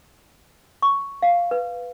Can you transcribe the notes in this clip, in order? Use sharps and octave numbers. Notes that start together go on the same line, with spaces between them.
C#6
F5
B4